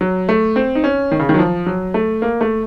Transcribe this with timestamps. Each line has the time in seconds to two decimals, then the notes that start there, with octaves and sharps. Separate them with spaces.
0.01 F#3
0.29 A3
0.56 C4
0.75 D#4
0.84 C#4
1.11 D#3
1.20 C#3
1.29 D#3
1.34 F#3
1.39 F3
1.66 F#3
1.94 A3
2.22 A#3
2.41 A3